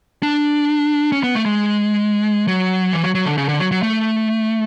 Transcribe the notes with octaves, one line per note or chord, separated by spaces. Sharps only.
D4
C#4
B3
A3
G#3
F#3
E3
F#3
F#3
D3
C#3
D3
F#3
F#3
A3